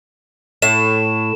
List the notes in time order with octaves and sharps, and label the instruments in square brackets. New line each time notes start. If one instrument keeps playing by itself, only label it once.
[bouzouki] A2 [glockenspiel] E7